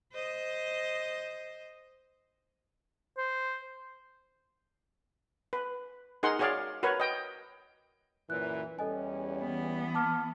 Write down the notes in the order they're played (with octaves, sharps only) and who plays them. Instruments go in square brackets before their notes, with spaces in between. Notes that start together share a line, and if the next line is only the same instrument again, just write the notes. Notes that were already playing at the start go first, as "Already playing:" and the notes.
[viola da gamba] C5 D#5
[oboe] C5
[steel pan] B4
D#4 G#4 A#4 F#5 C6
F#4 G#4 C#5 D5 F5
F#4 A#4 B4 C#5
D#5 G5
[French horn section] F#2 A#2 E3 [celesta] F#6
[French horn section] E2 G3 C#4 [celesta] A4 D#5 G#5
[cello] E3 B3
[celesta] A5 D6 F6